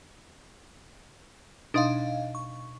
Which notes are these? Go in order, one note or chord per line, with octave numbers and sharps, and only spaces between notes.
B2 D4 D#4 D#5 F5 C6
C#6